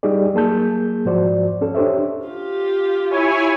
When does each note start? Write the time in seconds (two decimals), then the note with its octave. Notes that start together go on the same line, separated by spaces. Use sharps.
0.03 G3 D#4 G4 G#4 D5
0.33 F#3 A#3 G#4 A5 G6
1.05 G#2 F3 F#4 C5 D5
1.61 C#4 A4
1.75 D4 G4 C5 C#5 E5
2.25 F4 G4
3.10 E4 C#5 G#5